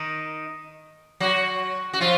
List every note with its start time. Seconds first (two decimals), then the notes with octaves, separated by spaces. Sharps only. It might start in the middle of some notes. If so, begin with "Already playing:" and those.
Already playing: D#3 D#4
1.20 F#3 F#4
1.93 F#4
2.01 F3 F4